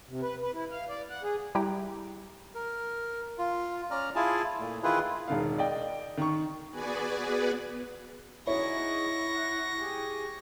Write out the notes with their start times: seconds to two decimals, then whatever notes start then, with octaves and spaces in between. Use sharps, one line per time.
0.09 C3
0.22 B4
0.42 B4
0.53 E4
0.71 F5
0.89 D5
1.10 F#5
1.23 G#4
1.55 G3 E4 G4 G5 A#5
2.55 A#4
3.38 F4
3.91 C#4 D5 A#5 F6
4.15 E4 F4 G#4 G#5 A5
4.59 A#2 A3
4.83 D#3 E3 E4 F4 G#4 B4
5.28 E1 D#3 F5
5.58 D5 D#5 G5
6.17 D#3 C#6
6.71 B3 F#4 G#4 B4 D5 G#5
8.47 D#4 E4 F#4 G#4 C#5 C#6 A#6
9.33 F#5
9.78 G4 G#4